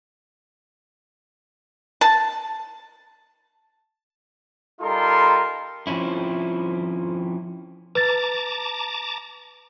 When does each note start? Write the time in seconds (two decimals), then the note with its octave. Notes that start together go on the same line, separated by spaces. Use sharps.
2.01 A5
4.80 G3 D#4 F4 A4 A#4 C6
5.87 F3 C4 C#4 E4
7.95 B4 A5 A#5 D6 A6